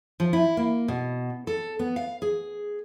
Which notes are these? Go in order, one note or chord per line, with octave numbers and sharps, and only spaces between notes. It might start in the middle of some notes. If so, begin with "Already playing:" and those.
F3
E4
A#3
B2
A4
B3
F5
G#4